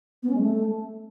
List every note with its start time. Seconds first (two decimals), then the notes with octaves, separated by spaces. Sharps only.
0.23 B3
0.29 C#4
0.35 G#3
0.41 A3